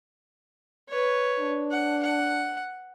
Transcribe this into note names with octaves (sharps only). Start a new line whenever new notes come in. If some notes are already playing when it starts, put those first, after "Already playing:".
B4 C#5
D4
F#5
F#5